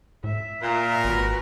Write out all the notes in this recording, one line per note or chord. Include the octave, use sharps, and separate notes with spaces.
A2 E5
A#2 A#4
G#1 F#4 B4